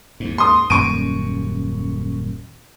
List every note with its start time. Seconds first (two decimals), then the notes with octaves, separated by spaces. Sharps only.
0.20 D#2 G#2
0.38 C6 D#6
0.70 D#1 F#2 C#6 D7 D#7